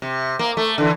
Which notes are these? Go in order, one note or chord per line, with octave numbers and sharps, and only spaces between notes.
C3
A#3
A3
D3 E3